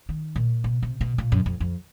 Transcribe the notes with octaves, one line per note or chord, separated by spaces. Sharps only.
D#3
A#2
B2
C3
B2
A#2
F#2
F2
F2